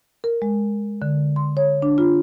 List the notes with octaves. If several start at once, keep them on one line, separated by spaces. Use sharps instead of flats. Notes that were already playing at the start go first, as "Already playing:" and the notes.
A#4
G#3
D3
C6
C#5
D4
F4